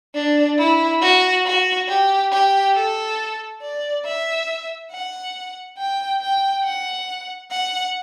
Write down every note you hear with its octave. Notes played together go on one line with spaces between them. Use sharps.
D4
E4
F#4
F#4
G4
G4
A4
D5
E5
F#5
G5
G5
F#5
F#5